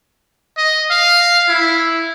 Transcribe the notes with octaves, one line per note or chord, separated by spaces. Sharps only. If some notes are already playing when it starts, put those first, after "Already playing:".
D#5
F5
E4